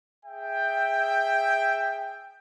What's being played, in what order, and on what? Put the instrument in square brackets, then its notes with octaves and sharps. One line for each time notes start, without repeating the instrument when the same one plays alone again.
[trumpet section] G#4 E5 G5